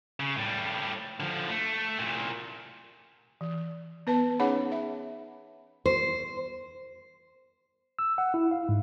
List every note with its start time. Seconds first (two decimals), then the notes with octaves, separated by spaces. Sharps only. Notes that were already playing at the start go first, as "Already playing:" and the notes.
0.20 C#3
0.37 A2 G3
1.20 D3 F3
1.49 A3
1.99 C2 A#2
3.41 E3
4.07 B3 B4 A5
4.39 C#4 D#4 G#4 C#5 F#5 B5
4.72 E5
5.86 C5
7.99 E6
8.18 F#5
8.34 E4
8.51 F5
8.69 G#2